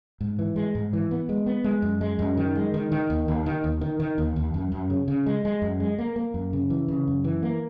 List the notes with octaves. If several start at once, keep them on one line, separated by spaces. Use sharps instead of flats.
G#2
E3
G#3
G#2
E3
B3
G#3
B3
G#3
F#2
G#3
F#2
D#3
G#3
D#3
D#3
D#2
D#2
D#3
D#2
D#3
D#3
D#2
D#2
F#2
F#2
C#3
C#3
G#3
G#3
F#2
G#3
A#3
A#3
F#2
C#3
E3
C#3
F#2
E3
A#3